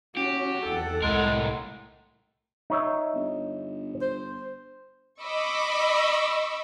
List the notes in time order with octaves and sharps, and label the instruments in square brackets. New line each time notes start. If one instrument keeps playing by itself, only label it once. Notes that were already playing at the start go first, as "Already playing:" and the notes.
[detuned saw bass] C#4 [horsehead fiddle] F#4 [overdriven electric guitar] G4
[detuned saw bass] E2 [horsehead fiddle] A4 F#5
[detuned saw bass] C2 [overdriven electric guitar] A2 A#4 [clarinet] G#3
[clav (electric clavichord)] D#4 C#5 E5
[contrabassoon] G1
[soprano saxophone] C5
[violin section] D#5 B5 C#6 D6 E6